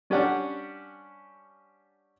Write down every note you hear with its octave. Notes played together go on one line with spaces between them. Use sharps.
G3 C#4 D4 G4 D5 F#5